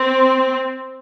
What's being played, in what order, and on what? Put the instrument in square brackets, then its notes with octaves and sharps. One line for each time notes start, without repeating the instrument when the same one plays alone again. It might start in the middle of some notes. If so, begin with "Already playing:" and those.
Already playing: [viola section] C4